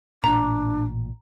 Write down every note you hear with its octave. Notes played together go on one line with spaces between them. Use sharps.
A1 A#2 D4 A#5